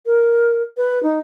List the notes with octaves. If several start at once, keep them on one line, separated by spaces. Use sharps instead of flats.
A#4
B4
D#4